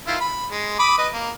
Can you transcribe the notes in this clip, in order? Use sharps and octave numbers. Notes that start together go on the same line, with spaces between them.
D#3 E4 F4
B5
G#3
B5 D6 D#6
B4 D#5
A#3